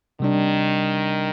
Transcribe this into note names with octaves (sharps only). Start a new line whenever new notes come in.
C3 D#3 G3 D4